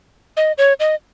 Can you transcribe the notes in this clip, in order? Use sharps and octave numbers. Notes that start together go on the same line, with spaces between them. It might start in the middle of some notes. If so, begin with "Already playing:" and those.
D#5
C#5
D#5